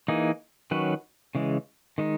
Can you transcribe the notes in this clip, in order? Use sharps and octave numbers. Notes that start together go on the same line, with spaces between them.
E3 A#3 D#4 G#4
D#3 F#3 C#4 F#4 B4
C#3 E3 G#3
D#3 G#3 D#4